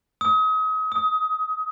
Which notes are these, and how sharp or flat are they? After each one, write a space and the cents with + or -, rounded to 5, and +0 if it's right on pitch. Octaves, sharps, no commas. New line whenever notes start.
D#6 +35
D#6 +20